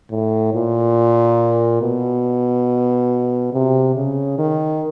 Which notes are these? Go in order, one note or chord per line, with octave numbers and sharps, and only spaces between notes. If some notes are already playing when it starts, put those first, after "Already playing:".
A2
A#2
B2
C3
C#3
D#3